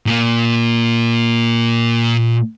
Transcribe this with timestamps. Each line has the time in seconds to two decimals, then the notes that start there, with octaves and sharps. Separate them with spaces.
0.06 A#2 A#3